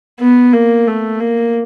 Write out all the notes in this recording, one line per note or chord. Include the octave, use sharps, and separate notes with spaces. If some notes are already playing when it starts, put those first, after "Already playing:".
B3
A#3
A3
A#3